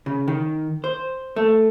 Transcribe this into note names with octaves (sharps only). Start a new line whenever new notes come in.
C#3
D#3
C5
A3